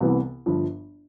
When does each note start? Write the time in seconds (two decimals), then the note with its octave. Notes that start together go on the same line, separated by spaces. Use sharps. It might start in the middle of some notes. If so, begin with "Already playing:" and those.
0.01 C2 C3 E3 B3
0.46 G1 G2 F3